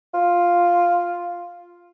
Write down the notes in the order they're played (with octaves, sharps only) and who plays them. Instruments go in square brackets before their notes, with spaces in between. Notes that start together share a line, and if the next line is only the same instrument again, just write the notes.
[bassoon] F4